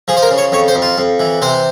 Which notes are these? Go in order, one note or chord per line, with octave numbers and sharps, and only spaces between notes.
F3 G#4
C5
A#4
C#3
C#5
F2 C#5
C5
F2
F4
F2
E3
C3 C5